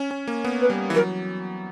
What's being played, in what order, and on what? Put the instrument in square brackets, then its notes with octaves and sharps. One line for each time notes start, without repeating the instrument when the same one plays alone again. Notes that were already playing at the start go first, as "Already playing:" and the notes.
Already playing: [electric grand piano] C#4
C#4
A#3
B3
[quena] B4
[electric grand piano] G3
E3
[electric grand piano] F#3 [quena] A#4